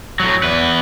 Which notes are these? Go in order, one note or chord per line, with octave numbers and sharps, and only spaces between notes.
A2 F#3
E2 B4